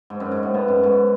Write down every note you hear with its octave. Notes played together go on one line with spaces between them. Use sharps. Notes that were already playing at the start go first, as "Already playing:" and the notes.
G#2
F#2
G#2
A2
B2
F#2
G#2